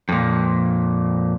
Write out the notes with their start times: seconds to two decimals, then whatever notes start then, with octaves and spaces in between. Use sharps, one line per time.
0.09 F2 A#2